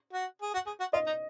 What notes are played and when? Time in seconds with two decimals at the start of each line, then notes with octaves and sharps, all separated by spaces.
0.13 F#4
0.42 G#4
0.54 F#4
0.67 G#4
0.80 F#4
0.93 F4 D#5
1.07 D#4